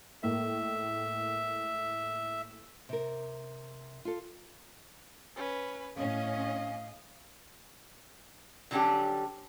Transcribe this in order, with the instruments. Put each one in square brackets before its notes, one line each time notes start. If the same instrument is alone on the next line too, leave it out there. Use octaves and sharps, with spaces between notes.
[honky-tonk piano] A2 G#3 A#3 [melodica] E5
[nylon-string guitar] C3 A#4
F4 A4
[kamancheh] C#4 B4
[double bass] A2 [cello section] C#4 [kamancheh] D#5 [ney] F5
[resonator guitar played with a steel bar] D3 F#3 G3 C#4 D4 G4